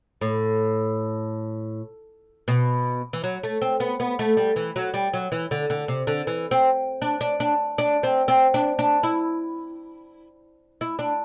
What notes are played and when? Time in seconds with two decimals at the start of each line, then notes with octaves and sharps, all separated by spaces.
0.21 A2
2.48 B2
3.13 E3
3.24 F#3
3.43 A3
3.62 C4
3.80 B3
4.00 B3
4.19 A3
4.37 G3
4.56 E3
4.76 F#3
4.94 G3
5.13 F#3
5.32 E3
5.51 D3
5.70 D3
5.88 C3
6.07 D3
6.27 E3
6.51 C4
7.02 D4
7.21 D4
7.40 D4
7.78 D4
8.03 C4
8.28 C4
8.54 D4
8.79 D4
9.03 E4
10.81 E4
10.99 D4